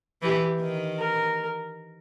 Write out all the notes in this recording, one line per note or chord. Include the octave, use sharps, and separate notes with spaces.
E3 G4
D#3
A#4